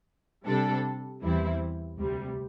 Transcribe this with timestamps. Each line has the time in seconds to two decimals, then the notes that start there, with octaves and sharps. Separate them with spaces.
0.46 C3 G3 D4 A4
1.22 E2 E3 G3 C4 E4
1.98 D2 C3 G3